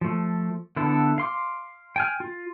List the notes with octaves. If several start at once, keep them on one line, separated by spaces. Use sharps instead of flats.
F3 A3
D3 B3 E4 A4
F5 C6 D6
G5 G#5 F6
F4